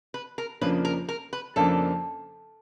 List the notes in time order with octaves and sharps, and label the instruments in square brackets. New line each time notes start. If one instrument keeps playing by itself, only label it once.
[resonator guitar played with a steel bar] B4
A#4
[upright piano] F2 C#3 F3 A#3 D4 [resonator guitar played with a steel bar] B4
[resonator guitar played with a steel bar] A#4
A#4
B4
[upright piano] F2 C#3 F3 A#3 D4 [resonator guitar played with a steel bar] A4